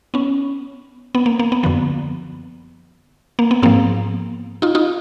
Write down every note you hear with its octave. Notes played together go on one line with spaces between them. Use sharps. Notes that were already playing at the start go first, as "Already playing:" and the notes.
B3 C#4
B3
A#3
A#3
B3
F#2 D3 F3 B3
A#3
B3
G#2 F3 A#3 C4
D#4 F4
D#4 F4